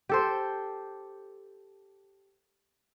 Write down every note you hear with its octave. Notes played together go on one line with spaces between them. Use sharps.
G4 A4 C5